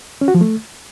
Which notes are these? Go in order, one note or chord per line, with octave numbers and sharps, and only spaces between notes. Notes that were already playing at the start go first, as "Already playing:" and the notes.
C#4
F#4
F3
A3